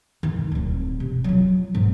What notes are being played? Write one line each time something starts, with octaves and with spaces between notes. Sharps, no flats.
D#3
D1 C4
C3
F#3 F4
G#2 C4